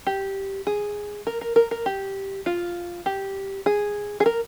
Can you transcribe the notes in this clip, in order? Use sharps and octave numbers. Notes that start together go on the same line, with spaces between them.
G4
G#4
A#4
A#4
A#4
A#4
G4
F4
G4
G#4
G#4
A#4